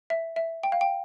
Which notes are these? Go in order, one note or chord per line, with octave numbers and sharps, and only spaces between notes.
E5
E5
G5
F5
G5